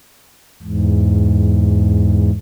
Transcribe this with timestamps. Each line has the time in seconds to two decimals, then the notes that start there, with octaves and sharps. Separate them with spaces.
0.63 E2 G#2